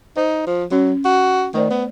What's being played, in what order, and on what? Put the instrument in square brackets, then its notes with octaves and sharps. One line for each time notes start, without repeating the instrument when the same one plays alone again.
[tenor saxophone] D#4 [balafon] C5
[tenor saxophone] F3
[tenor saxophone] F#3 [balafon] C#4
[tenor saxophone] F#4
[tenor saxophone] D#3 [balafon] A3 C5 D5
[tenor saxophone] B3